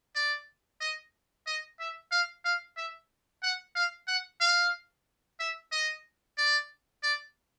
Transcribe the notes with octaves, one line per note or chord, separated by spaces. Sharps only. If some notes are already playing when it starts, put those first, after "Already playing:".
D5
D#5
D#5
E5
F5
F5
E5
F#5
F5
F#5
F5
E5
D#5
D5
D5